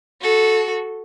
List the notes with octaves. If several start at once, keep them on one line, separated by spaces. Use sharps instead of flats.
F#4 A4